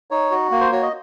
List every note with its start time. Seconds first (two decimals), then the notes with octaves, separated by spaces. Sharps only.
0.11 D#4 C#5
0.31 F#4
0.51 A#3
0.61 C5
0.72 F#4 C#5
0.82 D#5